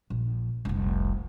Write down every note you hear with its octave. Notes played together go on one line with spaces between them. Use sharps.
A#1
F1 C2